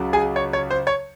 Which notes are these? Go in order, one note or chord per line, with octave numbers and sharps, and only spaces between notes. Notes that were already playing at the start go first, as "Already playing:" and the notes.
Already playing: C#2 C#3 F#3
G#4 G#5
C#5
C#5
C5
C#5